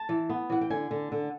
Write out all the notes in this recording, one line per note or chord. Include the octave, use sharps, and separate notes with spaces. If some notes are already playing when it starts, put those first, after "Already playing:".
Already playing: A5
E3
B3
E3 F#5
G5
D3 G#5
D3
D3